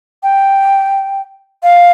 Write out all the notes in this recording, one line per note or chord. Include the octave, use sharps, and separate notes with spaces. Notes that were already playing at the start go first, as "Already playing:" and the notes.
G5
F5